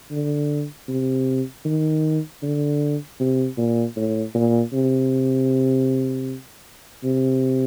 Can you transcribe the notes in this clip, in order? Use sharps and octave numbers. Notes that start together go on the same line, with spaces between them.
D3
C3
D#3
D3
C3
A#2
A2
A#2
C3
C3